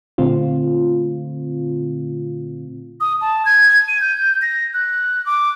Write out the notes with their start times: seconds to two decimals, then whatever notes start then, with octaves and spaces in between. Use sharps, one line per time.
0.18 A#2 D3 A3 C4 F4
3.00 D#6
3.21 A5
3.45 G#6
3.88 D#7
4.01 G6
4.42 A#6
4.74 F#6
5.26 D6